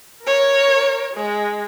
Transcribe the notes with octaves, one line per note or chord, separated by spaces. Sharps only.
A#4 C#5
G#3